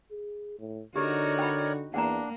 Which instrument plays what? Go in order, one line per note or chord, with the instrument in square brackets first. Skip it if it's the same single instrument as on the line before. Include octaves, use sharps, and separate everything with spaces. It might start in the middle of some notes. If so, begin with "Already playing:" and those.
[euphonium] G#4
A2
[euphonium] D3 [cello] D#4 F#4 [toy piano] G4 [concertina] A#4 C#5 D5
[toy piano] G5 B5
[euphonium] E2 [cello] A#3 [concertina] D4 [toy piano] F#5 G5 A#5